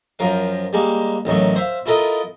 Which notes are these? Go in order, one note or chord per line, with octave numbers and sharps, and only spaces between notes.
F#2 F3 A#4 F5
G3 G#3 A#3
A1 D#3 F#3 A3
C5 E5 F5
E4 F4 A4 A#4 D#5